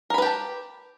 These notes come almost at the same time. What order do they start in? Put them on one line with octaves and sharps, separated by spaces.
A#4 B5 B4 G4 A5